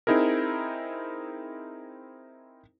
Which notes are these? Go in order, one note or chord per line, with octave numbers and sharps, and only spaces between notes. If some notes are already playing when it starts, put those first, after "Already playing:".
C4 D#4 E4 G#4 A#4